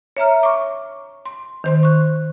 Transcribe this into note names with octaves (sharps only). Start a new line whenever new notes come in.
C#5 E5 A#5 F6
C#6 D6
C6
D#3 C5 C6
C#6 F#6